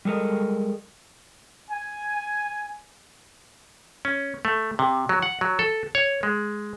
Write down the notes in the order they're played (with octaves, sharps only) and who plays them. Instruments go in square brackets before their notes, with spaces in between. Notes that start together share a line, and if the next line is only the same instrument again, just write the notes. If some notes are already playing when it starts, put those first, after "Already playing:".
[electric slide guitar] G3 G#3 A4 A#4 D#5
[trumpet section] G#5
[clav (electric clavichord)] C#4
A3
C3
F#3
F#5
F#3
A4
C#5
G#3